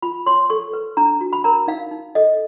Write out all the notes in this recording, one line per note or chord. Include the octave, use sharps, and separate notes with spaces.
F4 B5
C#5 C6
A4 C#6
B4
D4 A#5
F#4
B5
A#4 A#5
D#4 F5
D#4
A4 D#5